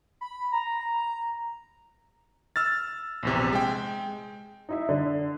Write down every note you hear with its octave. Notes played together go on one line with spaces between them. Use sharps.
B5
A#5
E6 F6 A6
A#1 E2 C3
G#3 G5
D#4 E4 E5
D3